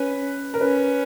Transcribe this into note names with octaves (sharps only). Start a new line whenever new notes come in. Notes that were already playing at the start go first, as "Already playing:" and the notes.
Already playing: C#4 B4
A#4
C#4 B4